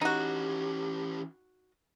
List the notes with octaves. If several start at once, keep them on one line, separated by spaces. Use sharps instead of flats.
E3 C#4 D#4 F#4 G4